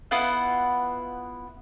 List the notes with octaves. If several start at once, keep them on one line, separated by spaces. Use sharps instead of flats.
B3 E4 F4 F#5